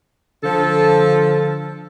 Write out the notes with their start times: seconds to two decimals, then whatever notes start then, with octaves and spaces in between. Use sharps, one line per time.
0.43 D3 F3 A4